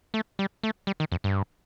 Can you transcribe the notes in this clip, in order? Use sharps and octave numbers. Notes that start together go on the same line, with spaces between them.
A3
G3
A3
G3
D#3
F2
G2